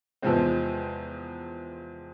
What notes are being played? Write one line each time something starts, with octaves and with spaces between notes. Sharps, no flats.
E2 C3 F3 G#3 C4